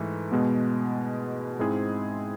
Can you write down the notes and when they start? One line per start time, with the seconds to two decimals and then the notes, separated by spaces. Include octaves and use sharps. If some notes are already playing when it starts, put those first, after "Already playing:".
Already playing: G#2 E3 A3
0.32 B2 G#3 B3
1.59 G#2 G#3 C4 E4 G#4